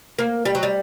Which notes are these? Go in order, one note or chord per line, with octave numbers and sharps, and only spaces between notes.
A#3
G3
F#3
G3